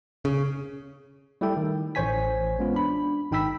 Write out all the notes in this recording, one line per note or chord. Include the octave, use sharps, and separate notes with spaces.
C#3
G3 A3 E4 G4 A4 G5
D#3
A1 C5 C#5 G#5 B6
G#3 B3 C#4 F4
D4 B5
G#1 D#4 G5 B5 E6 B6